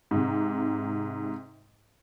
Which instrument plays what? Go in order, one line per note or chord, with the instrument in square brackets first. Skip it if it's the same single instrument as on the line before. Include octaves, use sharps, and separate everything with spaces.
[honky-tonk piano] G#2 C3